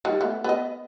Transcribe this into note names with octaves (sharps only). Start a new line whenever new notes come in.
D#3 G3
A3 B3
B3 D#5